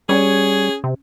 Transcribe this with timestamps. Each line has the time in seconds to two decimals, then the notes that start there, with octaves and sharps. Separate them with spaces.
0.09 G3 C#4 G#4
0.84 C3